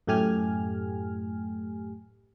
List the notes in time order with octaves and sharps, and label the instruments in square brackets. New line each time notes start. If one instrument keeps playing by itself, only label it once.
[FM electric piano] F#2 A2 A3 G4 G#5 F6